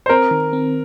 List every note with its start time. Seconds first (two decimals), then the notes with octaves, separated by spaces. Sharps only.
0.06 C5
0.09 C4 A#4
0.31 D#3
0.53 C4